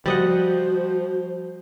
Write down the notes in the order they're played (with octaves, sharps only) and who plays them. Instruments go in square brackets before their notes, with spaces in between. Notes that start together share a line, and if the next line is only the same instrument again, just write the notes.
[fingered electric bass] F3 [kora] G3 D#5 F#5 [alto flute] F#4 [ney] C5